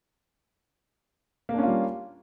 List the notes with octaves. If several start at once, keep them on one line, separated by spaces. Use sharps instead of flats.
G3 A#3 C#4 D4 F4